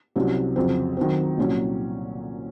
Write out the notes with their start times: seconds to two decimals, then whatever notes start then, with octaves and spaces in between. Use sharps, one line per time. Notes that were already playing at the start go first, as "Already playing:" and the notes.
0.16 C2 C3 F#3 C#4
0.56 F2 C#3 F#3 C4
0.97 D#3 F#3 C4
1.37 C2 A#2 F#3 C#4